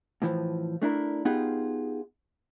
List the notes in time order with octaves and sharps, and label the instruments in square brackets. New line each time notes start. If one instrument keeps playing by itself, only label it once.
[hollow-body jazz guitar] A2 E3 F3
A3 D4 E4 A#4
B3 D#4 F4 G4 G#4